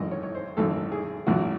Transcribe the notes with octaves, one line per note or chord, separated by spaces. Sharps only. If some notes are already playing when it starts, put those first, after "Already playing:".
Already playing: G#1 F#2 E3 D#5
C#5
C#5
C5
G#1 F#2 E3 A4
G#4
G#1 F#2 E3 F#4